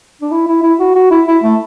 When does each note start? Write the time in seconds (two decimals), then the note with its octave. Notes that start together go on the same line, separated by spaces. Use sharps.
0.21 D4
0.31 E4
0.47 E4
0.63 E4
0.79 F#4
0.95 F#4
1.11 E4
1.27 E4
1.43 A3